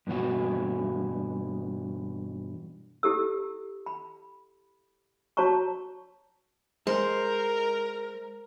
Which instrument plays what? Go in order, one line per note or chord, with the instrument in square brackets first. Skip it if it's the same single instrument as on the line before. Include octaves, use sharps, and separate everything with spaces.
[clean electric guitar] G2 B2 E3 F#4
[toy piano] E4 G4 A4 E6
B5
F#4 C#5 A5 A#5 C#6
[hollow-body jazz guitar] G#3 [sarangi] A#4 [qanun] C5